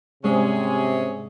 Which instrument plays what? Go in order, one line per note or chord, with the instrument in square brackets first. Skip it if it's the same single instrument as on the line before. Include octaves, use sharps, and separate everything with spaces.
[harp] G#2 G#3 D5 [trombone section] C3 [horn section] C#4 G#4